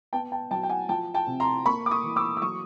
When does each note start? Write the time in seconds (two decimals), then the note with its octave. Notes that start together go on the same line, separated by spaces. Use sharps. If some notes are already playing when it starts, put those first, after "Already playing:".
0.13 B3 G5 A5
0.32 G5 A5
0.51 F#3 G5 A5
0.63 G5
0.69 F#5 G#5
0.89 F3 G5 A5
1.14 G5 A5
1.27 C3
1.40 A#5 C6
1.66 A#3 B5 C#6
1.86 D6
1.91 C#6 D#6
2.04 E3
2.16 D6 E6
2.37 E6
2.41 F#3 C#6 D#6